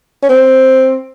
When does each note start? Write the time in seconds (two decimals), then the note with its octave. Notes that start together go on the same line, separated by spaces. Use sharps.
0.23 C#4
0.30 C4